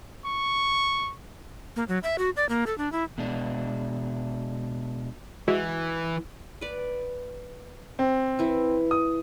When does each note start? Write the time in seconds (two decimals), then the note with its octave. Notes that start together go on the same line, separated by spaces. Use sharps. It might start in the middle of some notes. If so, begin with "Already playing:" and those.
0.25 C#6
1.76 A#3
1.88 F#3
2.03 E5
2.18 F#4
2.36 D5
2.49 A#3
2.67 A4
2.78 D4
2.92 E4
3.18 B2 G#3 D4
5.48 E3 G#3 E4 F#4
6.61 B4 D5
7.99 C4
8.39 E3 E4
8.91 D#6